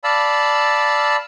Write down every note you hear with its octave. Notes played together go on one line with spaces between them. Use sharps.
D5 F5 A5 B5 E6